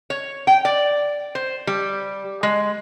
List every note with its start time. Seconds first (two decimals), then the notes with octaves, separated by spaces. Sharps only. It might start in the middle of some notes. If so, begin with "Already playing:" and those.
0.10 C#5
0.47 G5
0.65 D5
1.35 C5
1.67 G3
2.43 G#3